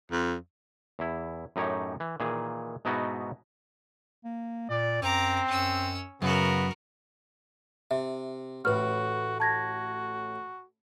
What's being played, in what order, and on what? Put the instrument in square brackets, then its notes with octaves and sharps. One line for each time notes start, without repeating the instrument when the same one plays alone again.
[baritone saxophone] F2
[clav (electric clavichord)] E2 E4
F#2 A2 D#4 G4 C#5
E3
A#2 D#3 E3 G#4
G#2 B2 B3 D#4 E4 F#4
[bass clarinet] A#3
[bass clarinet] A#2 [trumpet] D5
[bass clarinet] F#2 [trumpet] C4 [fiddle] A#5 D6
[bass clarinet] F#2 [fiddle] C#4 E6
[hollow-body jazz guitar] F#2 [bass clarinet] C#3 [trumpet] B3 [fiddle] F#4 A#4
[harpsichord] C3 [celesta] E5
[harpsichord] A1 A2 [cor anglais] F#4 [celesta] B4 F6
[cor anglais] F#4 [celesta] A5 G#6 A#6